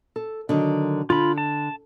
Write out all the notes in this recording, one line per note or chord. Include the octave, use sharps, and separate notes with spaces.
A4
D3 D#3 F#3
D3 F4 B5
A5